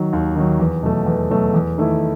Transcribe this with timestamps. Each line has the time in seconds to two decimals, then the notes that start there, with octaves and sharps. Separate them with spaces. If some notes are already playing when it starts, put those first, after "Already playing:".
Already playing: D#3 F#3
0.13 D#2
0.36 D#3 F#3
0.60 E2
0.83 B2 F#3 A3
1.06 E2
1.30 B2 F#3 A3
1.54 E2
1.78 D#3 A3 E4